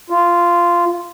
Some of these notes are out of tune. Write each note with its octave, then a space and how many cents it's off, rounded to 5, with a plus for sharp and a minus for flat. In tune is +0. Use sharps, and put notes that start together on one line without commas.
F4 -10